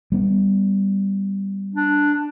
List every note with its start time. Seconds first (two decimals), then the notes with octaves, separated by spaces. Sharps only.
0.12 G3 B3
1.75 D4